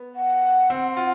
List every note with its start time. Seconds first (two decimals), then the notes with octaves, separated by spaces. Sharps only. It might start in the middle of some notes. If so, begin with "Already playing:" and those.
Already playing: B3
0.15 F#5
0.70 C4
0.97 F4